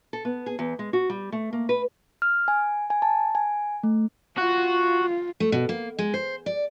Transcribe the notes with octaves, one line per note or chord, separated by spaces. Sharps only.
A4
B3
G#4
E2
G#3
F#4
G3
A3
A#3
B4
F6
G#5
G#5
A5
G#5
A3
F4 F#4
A3
B2
A#3
G#3
C5
D5